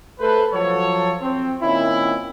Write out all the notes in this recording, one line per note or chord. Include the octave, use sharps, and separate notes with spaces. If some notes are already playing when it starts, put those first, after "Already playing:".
A3 A4 B4 C5
F3 F#3 A4 C#5
C4
A#2 D#3 C4 C#4 E4